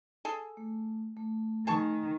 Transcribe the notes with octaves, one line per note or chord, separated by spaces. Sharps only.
G#4 A4
A3
A3
D#3 G#4 A5 C#6